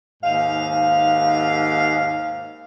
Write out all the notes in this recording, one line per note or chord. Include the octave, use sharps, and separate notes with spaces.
D#2 G#2 F5